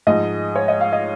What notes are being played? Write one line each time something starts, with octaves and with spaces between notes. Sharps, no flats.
G#2 F3 G#3 D#5
C#5
D#5
F5
D#5